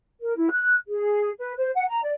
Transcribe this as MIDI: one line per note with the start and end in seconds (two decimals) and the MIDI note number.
0.20 0.35 70
0.36 0.48 64
0.51 0.74 90
0.87 1.29 68
1.38 1.53 71
1.57 1.69 72
1.75 1.86 78
1.88 1.99 82
2.02 2.12 74